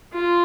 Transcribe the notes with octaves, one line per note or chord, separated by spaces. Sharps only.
F4